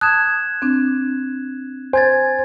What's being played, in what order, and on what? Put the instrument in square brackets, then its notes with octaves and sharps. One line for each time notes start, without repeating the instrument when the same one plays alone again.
[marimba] A5 D#6 [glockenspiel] F#6 G#6 E7
[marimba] C4 D4
[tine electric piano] C5 [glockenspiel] G#5 G#6 A6